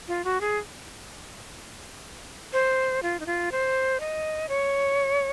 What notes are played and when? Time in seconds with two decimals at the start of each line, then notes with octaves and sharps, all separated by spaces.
0.08 F4
0.24 F#4
0.41 G#4
2.53 C5
3.03 F4
3.20 D#4
3.26 F4
3.52 C5
4.00 D#5
4.49 C#5